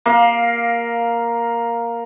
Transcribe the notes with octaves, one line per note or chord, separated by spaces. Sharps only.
A#3 F5